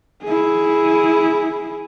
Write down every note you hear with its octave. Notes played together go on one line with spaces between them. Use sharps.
E4 G#4